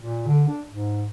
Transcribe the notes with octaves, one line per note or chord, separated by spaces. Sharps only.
A#2
D3
D4
G#2